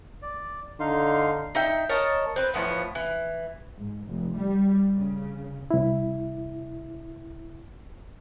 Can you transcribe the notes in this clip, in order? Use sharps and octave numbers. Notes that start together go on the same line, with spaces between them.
D5
D3 D#4 F5 C6
D#4 E5 G5
A#4 C#5 D#5 A5
C4 B4
A2 E3 F3 B3
E3
G#2
F1
G3
C#3
C2 E4